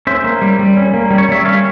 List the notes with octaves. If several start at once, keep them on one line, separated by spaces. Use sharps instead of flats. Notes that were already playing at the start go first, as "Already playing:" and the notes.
C#4 C5 E5
A#3
G3
G3
C#4
A#3
G3
C#5
G3 E5
C#4 C#5 F5